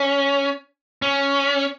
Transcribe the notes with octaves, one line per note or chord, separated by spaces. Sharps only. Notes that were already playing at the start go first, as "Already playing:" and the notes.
Already playing: C#4
C#4